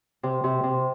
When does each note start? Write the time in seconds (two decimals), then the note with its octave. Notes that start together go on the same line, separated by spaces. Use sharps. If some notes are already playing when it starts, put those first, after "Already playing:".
0.23 C3
0.44 C3
0.64 C3